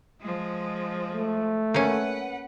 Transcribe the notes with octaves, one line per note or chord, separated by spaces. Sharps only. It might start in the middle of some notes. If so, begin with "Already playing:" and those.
F3 G#3
A3
A#3 C#4 B4 F#5